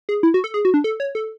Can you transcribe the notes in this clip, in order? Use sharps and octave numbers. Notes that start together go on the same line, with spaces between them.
G#4
E4
F#4
A4
G#4
F#4
D4
A4
C#5
A4